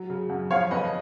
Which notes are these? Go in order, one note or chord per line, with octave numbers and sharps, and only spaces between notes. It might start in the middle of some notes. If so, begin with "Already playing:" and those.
Already playing: F#3
C#3
F#2
F3 C#5 F5
F2 B4 D#5